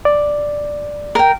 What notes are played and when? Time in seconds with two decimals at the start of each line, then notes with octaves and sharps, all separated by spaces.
0.05 D5
1.15 A#4 G5